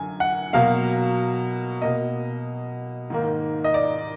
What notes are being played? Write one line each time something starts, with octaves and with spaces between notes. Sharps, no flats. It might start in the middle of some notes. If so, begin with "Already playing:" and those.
Already playing: F#2 D3 G#5
F#5
B2 F#3 A#3 F5
B2 A#3 D#5
G#2 D#3 A#3
D#5
D5